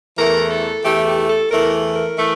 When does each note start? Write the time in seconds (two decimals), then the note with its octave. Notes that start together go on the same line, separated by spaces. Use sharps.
0.18 E2 E3 A3 A#4
0.51 A4
0.84 E2 E3 A3 G4
1.07 G4
1.29 A4
1.51 E2 E3 A3 A#4
1.95 A#4
2.18 E3 A3